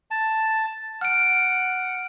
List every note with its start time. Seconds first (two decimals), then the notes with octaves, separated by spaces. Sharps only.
0.11 A5
1.01 F#5 F6 D7